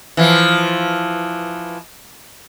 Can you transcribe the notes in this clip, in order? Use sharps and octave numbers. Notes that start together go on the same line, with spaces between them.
E3 F3